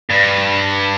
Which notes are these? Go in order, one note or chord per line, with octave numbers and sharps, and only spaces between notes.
G2